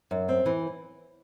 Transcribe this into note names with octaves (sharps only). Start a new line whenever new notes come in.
F#2
C4
E3